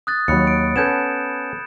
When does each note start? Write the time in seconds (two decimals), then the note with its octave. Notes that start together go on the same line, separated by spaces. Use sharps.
0.07 D#6 F#6 A6
0.28 D#2 F#3 B5 F#6 C#7
0.47 D7
0.76 B3 C#4 A4 G6 G#6 E7